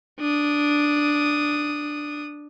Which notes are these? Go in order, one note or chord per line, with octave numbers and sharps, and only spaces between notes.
D4 D#6